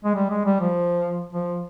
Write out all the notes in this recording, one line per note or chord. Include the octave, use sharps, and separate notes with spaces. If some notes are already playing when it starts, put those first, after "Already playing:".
G#3
G3
G#3
G3
F3
F3